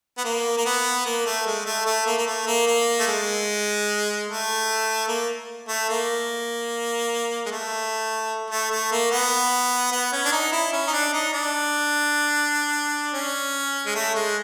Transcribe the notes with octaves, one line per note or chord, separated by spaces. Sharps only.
B3
A#3
A#3
B3
A#3
A3
G#3
A3
A3
A#3
A#3
A3
A#3
A#3
A3
G#3
A3
A#3
A3
A#3
G#3
A3
A3
A3
A#3
B3
B3
C#4
D4
D#4
E4
C#4
D#4
D4
D#4
D4
C#4
G#3
A3
G#3